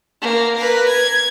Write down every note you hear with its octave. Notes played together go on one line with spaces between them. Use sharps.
A#3
A#4 B4
G#6